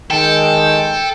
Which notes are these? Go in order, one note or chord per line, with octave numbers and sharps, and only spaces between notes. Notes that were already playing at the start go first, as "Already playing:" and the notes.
D#3 G#3 A4 G5